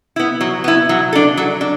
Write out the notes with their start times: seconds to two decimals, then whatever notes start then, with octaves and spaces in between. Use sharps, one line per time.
0.16 B3 E4
0.41 F#3
0.64 B3 E4
0.89 F#3
1.13 D4 A4
1.37 F#3
1.61 D4